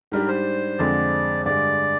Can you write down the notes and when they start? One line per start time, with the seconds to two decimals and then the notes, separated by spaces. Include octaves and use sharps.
0.12 G#2 G3 D4 G4 A#4
0.28 C5
0.78 F2 D3 G#3 C4 D5
1.46 G2 D3 G#3 D5